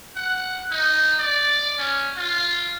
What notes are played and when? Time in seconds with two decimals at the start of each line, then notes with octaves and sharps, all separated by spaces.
0.16 F#5
0.71 D#4
1.19 D5
1.78 C#4
2.16 F4